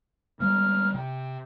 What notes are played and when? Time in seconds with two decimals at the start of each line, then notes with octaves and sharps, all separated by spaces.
0.40 D3 G3 G#3 F6
0.94 C3 G5